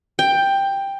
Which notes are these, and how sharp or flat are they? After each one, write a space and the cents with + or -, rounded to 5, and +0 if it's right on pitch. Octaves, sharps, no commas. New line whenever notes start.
G5 +10